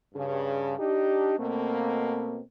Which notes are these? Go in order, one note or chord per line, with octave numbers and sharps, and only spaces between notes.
G2 C#3
D4 D#4 G4
B2 A3 A#3 C4